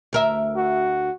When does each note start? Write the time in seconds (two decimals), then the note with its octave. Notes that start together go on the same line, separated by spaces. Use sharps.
0.13 D2 A#4 E5
0.57 F#4